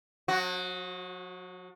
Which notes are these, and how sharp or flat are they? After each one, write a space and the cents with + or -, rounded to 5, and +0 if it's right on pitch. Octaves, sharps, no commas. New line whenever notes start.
F#3 -45 F#4 +0